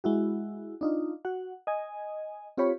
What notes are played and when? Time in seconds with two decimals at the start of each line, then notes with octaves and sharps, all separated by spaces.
0.04 G#3 E4 F#4
0.81 D4 D#4 F4
1.25 F#4 F#5
1.67 D#5 G#5
2.57 C4 F4 G4 C#5 B5